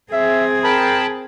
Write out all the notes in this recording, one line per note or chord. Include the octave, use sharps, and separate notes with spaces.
C4 G#4 E5
A#4 G5 A5 B5